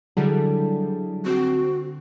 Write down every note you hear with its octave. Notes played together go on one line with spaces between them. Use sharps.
D3 F#3 G3 E4 G#4
C4 F#4